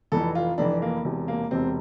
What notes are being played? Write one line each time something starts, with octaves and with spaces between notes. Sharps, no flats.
F1 F2 E3 A4
F4
F1 F2 E3 D4
A#3
E1 E2 C3
A#3
E1 E2 C3 C4